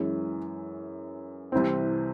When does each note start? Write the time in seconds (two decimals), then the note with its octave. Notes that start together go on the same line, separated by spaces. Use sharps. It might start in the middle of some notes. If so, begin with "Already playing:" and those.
Already playing: F#2 E3 G#3
1.52 C2 C3 E3 C4